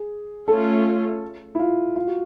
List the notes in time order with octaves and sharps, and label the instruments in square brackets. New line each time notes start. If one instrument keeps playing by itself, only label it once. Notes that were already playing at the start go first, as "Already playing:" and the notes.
Already playing: [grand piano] G#4
[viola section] A3 C#4 F4 [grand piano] A4
[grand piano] E4
F4
F4
F#4